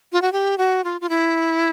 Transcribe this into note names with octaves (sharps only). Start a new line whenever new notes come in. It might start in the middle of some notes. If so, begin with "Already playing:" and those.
F4
F#4
G4
F#4
F4
F4
E4